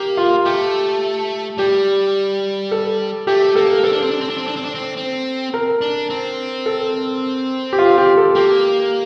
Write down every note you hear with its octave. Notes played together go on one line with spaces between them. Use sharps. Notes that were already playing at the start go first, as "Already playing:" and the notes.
Already playing: A#3 G4
F4
A3 G4
G3 G4
A4
A3 G4
A#3 A4
C4 A4
D4
C4
D4
C4
D4
C4
D4
C4
D4
C4
C4
A#4
D4
C4
A4
G4
F4
G4
A4
A#3 G4